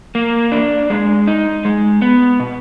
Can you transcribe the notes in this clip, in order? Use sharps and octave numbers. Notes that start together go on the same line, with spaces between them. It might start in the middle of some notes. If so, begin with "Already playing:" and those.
A#3
D4
G#3
D#4
G#3
B3
B2